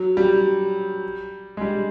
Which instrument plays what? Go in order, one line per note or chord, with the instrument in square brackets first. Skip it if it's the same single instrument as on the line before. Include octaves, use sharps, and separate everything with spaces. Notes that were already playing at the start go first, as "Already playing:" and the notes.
Already playing: [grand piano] F#3
G3
G#3
G3